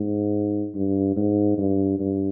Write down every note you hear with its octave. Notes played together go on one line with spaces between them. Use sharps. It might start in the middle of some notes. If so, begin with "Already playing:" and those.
Already playing: G#2
G2
G#2
G2
G2